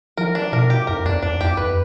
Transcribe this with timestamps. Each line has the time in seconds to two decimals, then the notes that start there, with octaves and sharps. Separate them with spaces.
0.17 F3 A#4
0.35 D4
0.52 B2 A#4
0.70 G4
0.87 F2 A#4
1.05 E2 D4
1.22 F2 D4
1.40 E2 G4
1.57 F2 B4